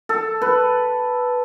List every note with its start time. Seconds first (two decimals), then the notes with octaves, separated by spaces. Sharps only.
0.09 A4
0.42 B4